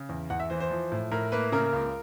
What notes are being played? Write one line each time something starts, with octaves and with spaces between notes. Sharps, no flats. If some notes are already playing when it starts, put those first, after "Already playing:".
Already playing: C#3
E2
E2 F#5
E5
E3 C5
C5
F3
A2
A2 A#4
A#3 B4
C#3 A#4
C#2